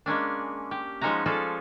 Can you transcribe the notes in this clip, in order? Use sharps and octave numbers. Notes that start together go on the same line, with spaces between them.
G#3 A#3 C#4 D4
G4
F3 G#3 C#4 D#4 F#4 A#5
F3 G#3 C#4 F4 A4 D5